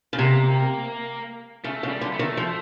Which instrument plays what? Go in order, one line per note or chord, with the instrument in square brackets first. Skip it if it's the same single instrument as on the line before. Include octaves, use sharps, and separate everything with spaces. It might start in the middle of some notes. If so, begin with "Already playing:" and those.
[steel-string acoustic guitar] C#3
[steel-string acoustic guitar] C3 [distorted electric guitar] A#3
[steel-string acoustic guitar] C#3 [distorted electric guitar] A3
[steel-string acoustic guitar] C#3
[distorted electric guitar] G3
[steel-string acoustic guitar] D3
[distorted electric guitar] A3
[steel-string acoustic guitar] D#3
F3